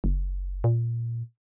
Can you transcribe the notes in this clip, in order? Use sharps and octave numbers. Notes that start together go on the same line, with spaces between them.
F#1
A#2